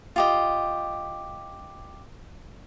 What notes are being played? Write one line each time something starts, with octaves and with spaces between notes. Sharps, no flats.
F4 G4 D#5